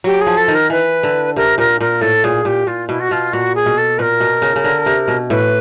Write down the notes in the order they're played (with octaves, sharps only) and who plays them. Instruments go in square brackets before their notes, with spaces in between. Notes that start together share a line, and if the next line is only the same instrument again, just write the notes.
[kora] F#3 [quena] G4
[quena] G#4
[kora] F3
[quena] A4
[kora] D#3
[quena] A#4
[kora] E3 [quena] B4
[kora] D3
[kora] C3 [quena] A#4
[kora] A#2 [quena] A#4
[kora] A#2 [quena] A#4
[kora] A2 [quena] A4
[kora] A#2 [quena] G#4
[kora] A#2 [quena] G4
[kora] A#2 [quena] F4
[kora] B2 [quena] E4
[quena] F#4
[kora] B2 [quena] F4
[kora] A#2 [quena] F#4
[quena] G#4
[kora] B2
[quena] A4
[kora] A#2 [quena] A#4 B4
[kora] B2
C#3
C#3
D3
C3
B2
[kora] A2 [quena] B4